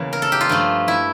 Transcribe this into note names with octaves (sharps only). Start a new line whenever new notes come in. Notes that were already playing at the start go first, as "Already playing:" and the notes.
Already playing: E2 C#3 E3 A#3
A#4
A4
G4
F4
G2 F3 A3
E4